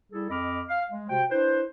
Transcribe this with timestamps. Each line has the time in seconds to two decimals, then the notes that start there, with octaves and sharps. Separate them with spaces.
0.13 G3 E4 G#4 A4
0.30 F2 C4 D#5 B5 D6 F6
0.69 F5
0.91 G#3
1.10 C3 F#4 C5 G5
1.30 D4 E4 B4 C5